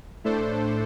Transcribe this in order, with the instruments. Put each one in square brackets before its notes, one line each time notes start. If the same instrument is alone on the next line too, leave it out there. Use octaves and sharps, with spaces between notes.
[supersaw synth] A2 A3 D4 A4 C5